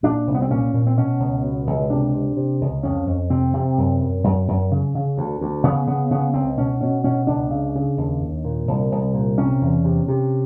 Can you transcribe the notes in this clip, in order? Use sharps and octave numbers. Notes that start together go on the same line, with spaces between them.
A#2 D4
C2
B3
C4
A#2 C#4
A#2
C4
B2 C#4
C#2
B2
C#2
C3 D4
C3
C3
C#2
F2 C#4
F2
C3 C4
C3
F#2
F#2
F#2
F#2
C#3
C#3
D2
D2
C#3 B3
C#3 B3
C#3 B3
C#2 C4
B2 C#4
B2 C#4
B2 C#4
C#2 D4
C#3
C#3
D#2
D#2
A#2
C2
C2
A#2
C3 C#4
E2
C3
C3